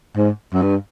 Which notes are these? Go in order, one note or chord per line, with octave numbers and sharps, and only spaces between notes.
G#2
F#2
G2